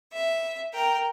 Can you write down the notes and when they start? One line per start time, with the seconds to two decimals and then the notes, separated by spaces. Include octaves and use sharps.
0.11 E5
0.73 A#4 G5